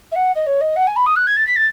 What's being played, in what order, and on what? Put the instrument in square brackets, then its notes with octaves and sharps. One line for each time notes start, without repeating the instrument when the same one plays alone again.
[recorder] E5
F#5
D#5
C#5
D#5
F#5
G#5
B5
D#6
F#6
G#6
A6
B6
A6